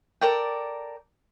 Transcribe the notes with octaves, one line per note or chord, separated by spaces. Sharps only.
A4 A#4 D5 G5